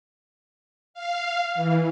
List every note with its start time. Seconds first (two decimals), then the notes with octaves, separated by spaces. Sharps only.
0.94 F5
1.55 E3